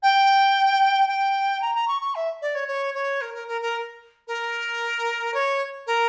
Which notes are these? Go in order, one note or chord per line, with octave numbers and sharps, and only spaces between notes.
G5
G5
A#5
A#5
C#6
C#6
E5
D5
C#5
C#5
C#5
A#4
A#4
A#4
A#4
A#4
C#5
A#4